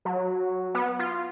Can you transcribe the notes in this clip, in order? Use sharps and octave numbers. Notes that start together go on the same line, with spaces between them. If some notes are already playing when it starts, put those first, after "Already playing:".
F#3
B3
F4